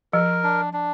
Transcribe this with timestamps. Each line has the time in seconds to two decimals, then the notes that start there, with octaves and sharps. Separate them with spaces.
0.13 F3 A#4
0.43 D4
0.73 D4